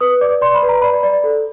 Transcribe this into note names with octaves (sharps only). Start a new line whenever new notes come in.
B4 D#6
D5 D6
D5 C6
B5
B4
A#5
D5 B5
D5
A4